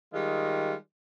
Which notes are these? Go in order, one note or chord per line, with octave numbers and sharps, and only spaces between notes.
D#3 G3 G#3 F4